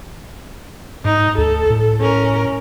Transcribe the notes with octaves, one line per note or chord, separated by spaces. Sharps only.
G#2 D#4
D2 A4
A2
C#4 A#4